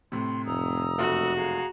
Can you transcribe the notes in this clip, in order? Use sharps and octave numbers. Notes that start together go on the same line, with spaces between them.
A2 C3 C6
F1 A#5 D#6 E6
F#1 A3 F#4
G#4 F5 A#5